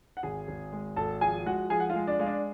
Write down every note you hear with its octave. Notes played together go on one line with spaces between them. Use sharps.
F#5
G#1 G#4 G#5
G#1
G#3
G#1 A4 A5
F3 G#4 G#5
G#3 F#4 F#5
F3 G#4 G#5
F#5
F4 F5
G#3
D4 D5
G#3 F5
D4 D5